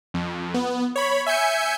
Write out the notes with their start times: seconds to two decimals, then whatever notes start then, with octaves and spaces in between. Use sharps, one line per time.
0.14 F2
0.54 B3
0.96 C#5 B5
1.26 E5 G#5 G6 C#7